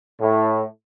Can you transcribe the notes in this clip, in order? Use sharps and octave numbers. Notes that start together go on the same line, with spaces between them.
A2